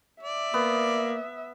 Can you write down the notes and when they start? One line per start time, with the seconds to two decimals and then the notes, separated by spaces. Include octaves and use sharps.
0.23 D5 E5
0.54 A#3 B3